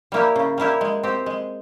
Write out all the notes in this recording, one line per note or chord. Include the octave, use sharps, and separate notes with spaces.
G3 A#3 E4 G4
C#3
G3 A#3 E4 G4
G#3
C4 G4
G#3